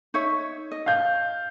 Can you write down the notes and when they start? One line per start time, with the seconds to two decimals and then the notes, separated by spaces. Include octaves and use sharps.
0.14 D#4 C#5 E5
0.71 D#5
0.86 F5 G6